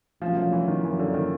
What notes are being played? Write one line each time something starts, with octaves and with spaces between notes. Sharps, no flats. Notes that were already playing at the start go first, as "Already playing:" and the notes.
C2 A#2 F3 F#3 A3 C#4
F3
E3
D#3
F#2 C#3 E3 F#3 A#3 C#4
D3
D#3